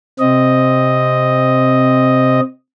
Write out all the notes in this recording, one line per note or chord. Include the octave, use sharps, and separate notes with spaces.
C3 C4 D#5